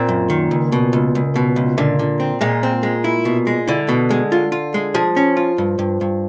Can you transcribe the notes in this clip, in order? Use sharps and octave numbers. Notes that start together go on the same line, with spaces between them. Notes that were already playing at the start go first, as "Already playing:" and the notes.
Already playing: A#2 C4
F#2
D#3
C#2
B2
C#2
C#2
B2
C#2
A#2 D3
D3
C4
A#2 G#3
C4
G#3
E4
B2
G#3
D3 E4
B2
G#3
F4
F4
G#3
F3 G#4
C#4
F4
G2
G2
G2